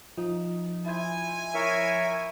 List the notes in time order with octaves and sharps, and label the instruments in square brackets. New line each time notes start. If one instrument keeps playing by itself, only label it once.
[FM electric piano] F3 [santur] D#4
[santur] E4 C5 [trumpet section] G#5
[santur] E4 C#6 [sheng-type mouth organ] A#4 C#5 E5